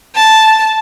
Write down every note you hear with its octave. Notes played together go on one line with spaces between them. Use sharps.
A5